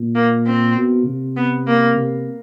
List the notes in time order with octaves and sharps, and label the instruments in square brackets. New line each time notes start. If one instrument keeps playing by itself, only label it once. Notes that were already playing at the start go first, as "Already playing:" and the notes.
Already playing: [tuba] A#2
[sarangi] A#3
C4
[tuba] B2
C3
[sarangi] B3
A#3
[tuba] C3